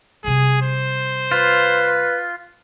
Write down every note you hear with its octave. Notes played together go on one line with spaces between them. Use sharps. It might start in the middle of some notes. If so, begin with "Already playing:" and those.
C3 G3 G#4
C5
F4 B4